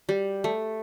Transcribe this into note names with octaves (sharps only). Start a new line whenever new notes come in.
G3
A3